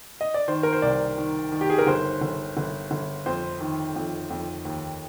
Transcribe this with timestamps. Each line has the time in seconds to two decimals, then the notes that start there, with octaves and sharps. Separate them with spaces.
0.21 D#5
0.34 D5
0.48 D#3 C5
0.63 A#4
0.73 C5
0.82 C2 D5
1.18 D#3
1.52 D#3
1.61 G4
1.70 G#4
1.78 A#4
1.87 G1 C5
2.21 G1
2.57 G1
2.91 G1
3.26 F2 C5
3.61 D#3
3.96 F2
4.30 F2
4.65 D#2